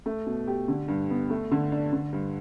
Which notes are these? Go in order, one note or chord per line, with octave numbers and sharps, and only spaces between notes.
A3
B2
G4
D3
G2
B3
A3
D3
D4
D3
G2